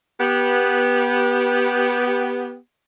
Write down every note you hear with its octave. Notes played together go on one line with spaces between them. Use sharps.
B3 G4